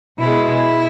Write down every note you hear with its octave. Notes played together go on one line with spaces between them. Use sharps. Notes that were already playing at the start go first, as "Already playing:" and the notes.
B2 G#3 E4